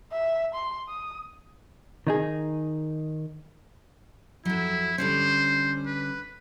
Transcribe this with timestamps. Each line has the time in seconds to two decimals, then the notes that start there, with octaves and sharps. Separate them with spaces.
0.12 E5
0.55 C6
0.88 D#6
2.07 D#3 D#4 G#4
4.45 F2 F#3 E4
4.98 D3 G3 C#4 C5
5.86 B4